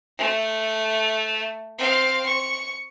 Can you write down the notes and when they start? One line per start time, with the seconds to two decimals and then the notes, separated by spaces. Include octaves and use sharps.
0.18 A3
1.78 C4 F5
2.26 C#6